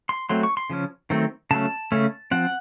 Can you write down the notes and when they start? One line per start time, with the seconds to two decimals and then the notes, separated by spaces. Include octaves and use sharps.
0.09 C6
0.29 F#3 A3 C4 C6
0.43 C#6
0.57 C6
0.70 C#3 F3 C#4
1.10 D#3 F#3 A3 C4
1.51 C#3 F#3 A3 C#4 A5
1.92 C#3 A3 C#4
2.31 F3 C4 F#5